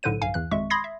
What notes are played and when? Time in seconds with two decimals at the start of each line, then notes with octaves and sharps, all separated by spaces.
0.03 B1 A2 D3 B4 C5 D#7
0.22 B1 G2 F5 G#5
0.34 E2 E3 F#6
0.51 G#1 F2 G#3 E5 C#6
0.70 B5 C6 D#6 G#6 A#6 C7
0.84 E5